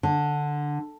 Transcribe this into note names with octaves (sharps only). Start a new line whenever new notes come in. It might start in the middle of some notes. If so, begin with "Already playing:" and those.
D3